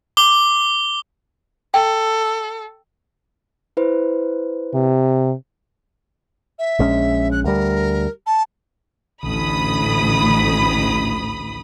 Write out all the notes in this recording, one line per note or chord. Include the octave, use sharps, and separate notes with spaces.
D6 G7
A4 G5
E4 B4 C5
C3
E5
A#1 G#3 C#4
F#6
D2 G3 A#4
A5
A1 D2 B5 D#6